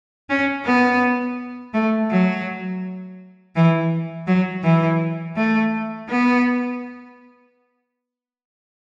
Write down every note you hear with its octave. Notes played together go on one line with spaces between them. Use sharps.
C#4
B3
A3
F#3
E3
F#3
E3
A3
B3